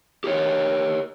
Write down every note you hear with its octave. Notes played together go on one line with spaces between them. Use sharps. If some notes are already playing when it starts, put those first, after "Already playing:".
G4 A#4 C#5